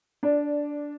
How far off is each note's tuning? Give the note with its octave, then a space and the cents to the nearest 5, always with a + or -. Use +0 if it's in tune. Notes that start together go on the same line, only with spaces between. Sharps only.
D4 -10 D5 +0